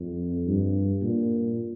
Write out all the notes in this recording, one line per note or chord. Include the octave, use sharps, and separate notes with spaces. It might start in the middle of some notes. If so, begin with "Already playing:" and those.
Already playing: F2
G2
A#2